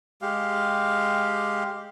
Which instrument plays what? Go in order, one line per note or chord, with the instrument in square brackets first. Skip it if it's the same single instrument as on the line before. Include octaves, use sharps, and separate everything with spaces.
[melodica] G#3 G4 F5